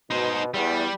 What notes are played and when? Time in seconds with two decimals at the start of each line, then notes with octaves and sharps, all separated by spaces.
0.11 B2 D#4 C5
0.54 E2 G3